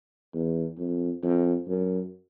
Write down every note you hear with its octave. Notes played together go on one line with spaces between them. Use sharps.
E2
F2
F2
F#2